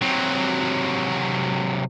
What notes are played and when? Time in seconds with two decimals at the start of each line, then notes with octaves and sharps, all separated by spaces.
0.02 C3 F#3